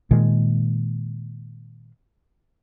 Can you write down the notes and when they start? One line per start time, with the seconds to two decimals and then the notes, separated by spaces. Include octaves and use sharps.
0.11 A#2 D#3 G#3